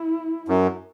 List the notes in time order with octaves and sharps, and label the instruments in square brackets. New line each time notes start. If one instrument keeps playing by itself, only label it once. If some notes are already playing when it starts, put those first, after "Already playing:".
Already playing: [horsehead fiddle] E4
[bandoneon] F#2